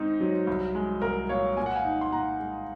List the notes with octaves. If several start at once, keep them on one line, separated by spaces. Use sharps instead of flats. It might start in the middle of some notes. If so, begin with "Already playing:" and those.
Already playing: G#2 C4 D#4
F#3
C2
G#3
C2 A#4
A#2 C#5 F5
A#2 G#5
F#5
F5 G#5
D#4
C6
A#2 F#5 A#5
G#3